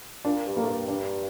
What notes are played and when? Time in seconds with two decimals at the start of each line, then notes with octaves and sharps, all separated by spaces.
0.25 A#2 D4
0.46 G2
0.57 A#3
0.63 A2
0.68 G2
0.88 D4